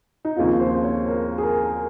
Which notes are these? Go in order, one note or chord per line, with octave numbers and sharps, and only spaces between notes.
D#4
D#2 C#3 F3 C4 F4
C5
C#5
A#4
G#4
A#4